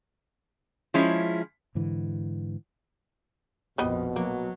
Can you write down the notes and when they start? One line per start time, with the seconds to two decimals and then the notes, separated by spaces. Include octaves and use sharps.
0.94 F3 G#3 C#4 E4
1.75 G#2 D3 E3
3.78 A#1 F2 B2 G3 B3 D#5
4.16 F#3 A#3